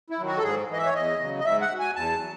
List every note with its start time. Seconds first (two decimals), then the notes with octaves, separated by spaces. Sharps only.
0.10 E4
0.18 D#3 F#3
0.27 F#4
0.37 A4
0.43 G#2 G#4
0.69 E3 D#5
0.78 E5
0.86 C#5
0.94 E2 D#5
1.20 C#3 F#3
1.40 D#5
1.45 G#2 E5
1.61 F#5
1.70 F#3
1.80 G#5
1.96 E2 A5
2.21 F#3